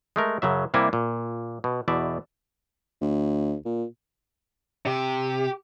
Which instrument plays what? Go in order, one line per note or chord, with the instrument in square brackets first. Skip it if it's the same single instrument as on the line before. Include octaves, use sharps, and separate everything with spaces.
[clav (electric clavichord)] G#3 A3 A#4
F#2 C#3 F#3 E5
C3 G3 A#3 E4 G#5
A#2
B2
E2 B2 D5 E5
[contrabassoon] D2
A#2
[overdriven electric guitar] C3 [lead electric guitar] G4